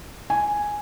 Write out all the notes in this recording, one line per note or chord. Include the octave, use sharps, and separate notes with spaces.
G#5